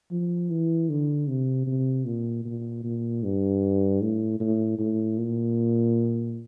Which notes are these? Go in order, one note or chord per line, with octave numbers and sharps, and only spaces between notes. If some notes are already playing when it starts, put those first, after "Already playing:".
F3
E3
D3
C3
C3
A#2
A#2
A#2
G2
A2
A2
A2
A#2